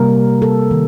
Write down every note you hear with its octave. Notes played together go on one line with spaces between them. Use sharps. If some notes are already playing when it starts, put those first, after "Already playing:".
Already playing: C3 G3 A#3 A#4
A4
D#3